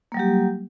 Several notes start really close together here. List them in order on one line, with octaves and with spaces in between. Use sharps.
A#3 G3 F#3 G4